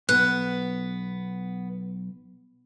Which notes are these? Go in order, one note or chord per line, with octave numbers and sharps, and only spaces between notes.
B1 B3 F#6